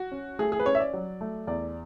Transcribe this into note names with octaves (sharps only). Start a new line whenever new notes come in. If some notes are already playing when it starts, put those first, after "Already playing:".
Already playing: F#4
C#4
A3 G#4
G#4
B4
C#4 C#5
E5
D5
F#3
A3
E2 D5